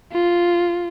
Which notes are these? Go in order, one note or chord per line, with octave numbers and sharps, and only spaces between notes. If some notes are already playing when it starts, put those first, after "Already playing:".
F4